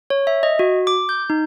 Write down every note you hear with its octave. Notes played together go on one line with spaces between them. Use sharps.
C#5
E5
D#5
F#4
D6
G6
D#4